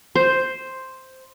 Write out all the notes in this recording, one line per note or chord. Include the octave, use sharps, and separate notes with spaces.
C5